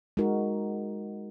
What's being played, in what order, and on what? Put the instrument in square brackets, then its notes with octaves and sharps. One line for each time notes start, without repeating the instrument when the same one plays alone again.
[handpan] G#3 D#4 F#4 A#4